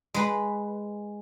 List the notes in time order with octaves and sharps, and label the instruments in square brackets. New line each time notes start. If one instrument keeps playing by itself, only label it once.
[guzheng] G#3 B4